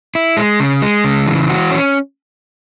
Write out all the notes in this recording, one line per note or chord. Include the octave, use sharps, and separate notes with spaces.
E4
G#3
C#3
G#3
C#3
E3
F#4
C#4